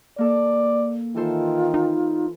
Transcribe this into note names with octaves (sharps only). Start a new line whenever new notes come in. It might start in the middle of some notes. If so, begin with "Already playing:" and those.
A#3 A4 D5
D#3 E3 F4 A4 C5
D#4